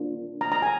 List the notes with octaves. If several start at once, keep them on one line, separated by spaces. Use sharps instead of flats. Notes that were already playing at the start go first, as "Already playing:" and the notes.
Already playing: A#3 D4 F4
A#5
A#5
G#5